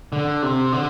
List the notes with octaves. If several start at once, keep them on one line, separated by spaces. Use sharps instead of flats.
D3
C3
D3